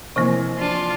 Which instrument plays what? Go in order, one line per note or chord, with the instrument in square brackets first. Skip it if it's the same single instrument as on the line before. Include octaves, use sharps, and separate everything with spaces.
[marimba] C3 F3 A#3 [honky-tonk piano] E3 C4
[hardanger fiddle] D4 F4